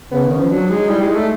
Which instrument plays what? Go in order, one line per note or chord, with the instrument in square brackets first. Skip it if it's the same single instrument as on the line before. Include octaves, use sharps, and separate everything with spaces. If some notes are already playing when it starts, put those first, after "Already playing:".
[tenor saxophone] C#3 [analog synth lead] B3
[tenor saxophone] D#3
[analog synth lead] C#4
[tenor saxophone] F3
[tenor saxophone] F#3 [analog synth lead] D4
[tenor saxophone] G#3 [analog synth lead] D#4
[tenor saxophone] G3 [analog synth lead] E4
[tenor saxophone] G#3
[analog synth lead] D#4
[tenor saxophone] A3